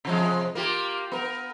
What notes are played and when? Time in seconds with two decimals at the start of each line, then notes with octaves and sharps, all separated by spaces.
0.05 C3 F3 G#3
0.55 A#3 F4 G4
1.12 B3 A#4